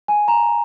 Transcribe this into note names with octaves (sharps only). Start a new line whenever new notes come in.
G#5
A#5